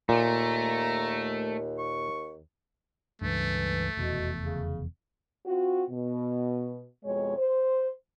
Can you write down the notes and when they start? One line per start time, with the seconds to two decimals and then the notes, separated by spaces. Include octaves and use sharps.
0.09 D#2 A#2 A3 A#5
1.78 C#6
3.22 C#2 G2 E3 A3
3.97 F1 E2 B2
4.42 C#3
5.46 C4 F4 F#4
5.91 B2
7.05 F2 B2 G#3 C#5
7.38 C5